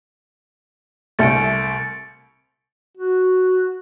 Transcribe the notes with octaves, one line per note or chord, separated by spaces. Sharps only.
C2 G3 A3 A6 C#7 D7
F#4